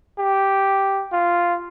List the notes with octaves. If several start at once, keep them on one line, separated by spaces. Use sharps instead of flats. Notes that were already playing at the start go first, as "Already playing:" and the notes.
G4
F4